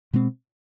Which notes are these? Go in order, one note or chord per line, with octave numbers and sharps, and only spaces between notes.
B2 G#3 C4